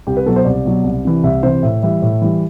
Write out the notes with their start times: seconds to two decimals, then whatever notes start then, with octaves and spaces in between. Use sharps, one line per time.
0.07 C2 G4
0.17 B4
0.26 B2 F#3 A4
0.36 C5
0.45 C2 D5
0.65 B2 F#3
0.84 C2
1.05 C3 E3
1.23 C2 E5
1.43 C3 E3 C5
1.63 A2 E5
1.83 E3 G3 E5
2.02 A2 E5
2.21 E3 G3